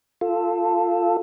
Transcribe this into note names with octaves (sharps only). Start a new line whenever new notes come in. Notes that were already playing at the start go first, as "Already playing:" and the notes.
F4 A4